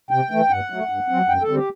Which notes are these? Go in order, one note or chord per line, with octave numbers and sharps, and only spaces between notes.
C3 G5
E3 A3
G2 F#5
F#3 A3
G2
F#3 C4
F#2 G5
A4
D3 G3 C4
G4